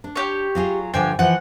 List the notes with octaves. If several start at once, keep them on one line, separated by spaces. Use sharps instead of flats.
D4
G4 C#5
F#3 F4 G#4
G2 D3 F3 C5 G5 G#5
E3 F3 F#5